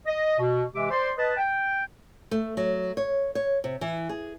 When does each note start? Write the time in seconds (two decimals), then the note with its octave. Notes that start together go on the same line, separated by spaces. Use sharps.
0.06 D#5
0.39 B2
0.74 C3 E3 G#3 G4 E5 D6
0.90 C5 D5 C6
1.17 B4 D#5 A5
1.37 G5
2.31 A3
2.57 F#3
2.97 C#5
3.35 C#5
3.64 C3
3.81 E3
4.09 G#4